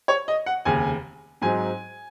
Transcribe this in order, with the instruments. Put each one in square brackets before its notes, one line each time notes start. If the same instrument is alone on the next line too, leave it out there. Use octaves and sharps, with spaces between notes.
[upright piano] C#5
D#5
F#5
F1 D#2 C#3 G#5
G#2 F#3 C4 D#4 G#5